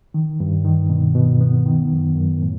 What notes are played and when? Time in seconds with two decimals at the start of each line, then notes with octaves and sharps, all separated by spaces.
0.14 D#3
0.40 G2
0.65 D#3
0.90 B2
1.15 B2
1.41 B3
1.66 D#3
1.92 F#2
2.16 F#2
2.42 A2